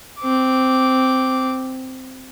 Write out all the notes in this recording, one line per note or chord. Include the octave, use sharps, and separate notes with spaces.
C4 D6